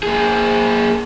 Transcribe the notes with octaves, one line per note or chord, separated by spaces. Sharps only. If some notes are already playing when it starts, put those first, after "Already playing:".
A#3 G#4